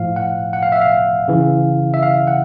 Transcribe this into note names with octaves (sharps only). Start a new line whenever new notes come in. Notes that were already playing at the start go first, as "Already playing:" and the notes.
Already playing: A2 F3 F5
F#5
F#5
F5
E5
F5
C#3 E3
E5
F5
F#5